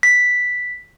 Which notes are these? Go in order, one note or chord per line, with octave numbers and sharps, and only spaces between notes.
B6